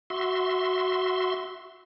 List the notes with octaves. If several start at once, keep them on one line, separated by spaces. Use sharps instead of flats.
F#4 E5 C6